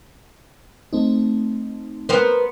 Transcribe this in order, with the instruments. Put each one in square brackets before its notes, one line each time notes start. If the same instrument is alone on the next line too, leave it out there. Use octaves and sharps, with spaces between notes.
[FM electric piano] A3 C4 D#4
[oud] B3 A#4 C5